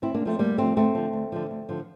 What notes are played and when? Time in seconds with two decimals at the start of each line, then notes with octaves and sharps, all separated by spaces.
0.02 D2 C4 E4
0.14 A#3 D4
0.21 D3
0.26 F3 A3 C4
0.39 D2 G3 A#3
0.57 D3 F3 A3 C4
0.76 D2 A3 C4
0.95 D3 F3
1.13 D2
1.32 D3 F3
1.51 D2
1.69 D3 F3